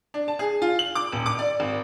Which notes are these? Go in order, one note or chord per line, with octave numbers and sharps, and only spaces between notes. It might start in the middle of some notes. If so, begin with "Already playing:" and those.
D4
A5
G#4
F4
F#7
D6
D#1
D6
D5
G#1